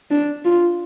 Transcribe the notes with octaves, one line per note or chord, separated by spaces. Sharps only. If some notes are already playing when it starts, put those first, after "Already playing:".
D4
F4